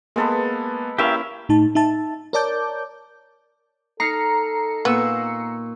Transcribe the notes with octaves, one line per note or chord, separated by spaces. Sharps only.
G#3 A#3 B3 A4 B4
A#3 C#4 E4 G4 E5 F5
A2 D#4 A5
D#4 E5 A5
A#4 C#5 D5 A5 D6 G6
D#4 A4 A#5 F6 C7 C#7
A#2 B3 C#6 E6